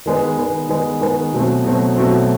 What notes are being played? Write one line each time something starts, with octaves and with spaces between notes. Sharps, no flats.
D#3 G#3 B3
D#3 G#3 B3
D#3 G#3 B3
D#3 G#3 B3
B2 F#3 A3 C4
B2 F#3 A3 C4
B2 F#3 A3 C4